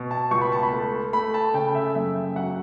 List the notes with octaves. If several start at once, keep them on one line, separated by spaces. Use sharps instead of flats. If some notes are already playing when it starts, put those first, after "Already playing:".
Already playing: B2
A5
C#2 C#6
B5
A5
B5
A3
A3 B5
A5
C#3 G5
E5
F#2 E5
F#3 F#5